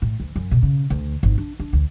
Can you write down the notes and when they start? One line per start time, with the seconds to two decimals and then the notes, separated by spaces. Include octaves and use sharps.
0.02 A2
0.20 D2
0.36 F#2
0.51 B2
0.62 C#3
0.90 D2
1.23 G#1
1.38 D4
1.59 D4
1.73 D2